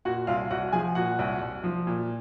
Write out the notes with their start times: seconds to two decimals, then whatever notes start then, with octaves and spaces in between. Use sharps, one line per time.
0.05 A#2 F#4 F#5
0.27 C2 F4 F5
0.50 C2 F#4 F#5
0.73 F3 G#4 G#5
0.95 A#2 F#4 F#5
1.19 C2
1.41 C2
1.64 F3
1.87 A#2